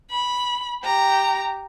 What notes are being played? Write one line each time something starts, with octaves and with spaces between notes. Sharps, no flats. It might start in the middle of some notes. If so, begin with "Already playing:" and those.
B5
G4 A#5